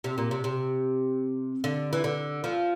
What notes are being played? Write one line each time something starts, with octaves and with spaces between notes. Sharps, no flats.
C3
A#2
C3
C3
D3
E3
D3
F3